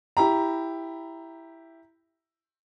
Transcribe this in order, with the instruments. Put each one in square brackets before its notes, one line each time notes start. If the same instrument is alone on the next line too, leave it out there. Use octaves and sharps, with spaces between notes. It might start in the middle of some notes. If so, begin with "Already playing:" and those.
[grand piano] E4 G4 A#5